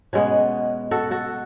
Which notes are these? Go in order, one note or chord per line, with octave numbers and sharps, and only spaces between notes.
B2 G#3 B3 C#4
F#4 A4
F#4 A4